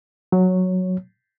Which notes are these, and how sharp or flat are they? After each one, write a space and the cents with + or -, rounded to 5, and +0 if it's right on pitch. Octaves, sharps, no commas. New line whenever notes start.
F#3 -5 C#5 +0